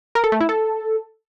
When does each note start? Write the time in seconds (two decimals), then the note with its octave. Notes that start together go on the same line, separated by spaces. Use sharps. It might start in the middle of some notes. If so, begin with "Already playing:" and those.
0.15 A#4
0.24 A4
0.32 A3
0.40 E4
0.49 A4